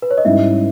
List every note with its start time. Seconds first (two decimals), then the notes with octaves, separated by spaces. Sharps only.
0.02 B4
0.11 C#5
0.18 D#5
0.25 G#2 G3 C#4 E4 E5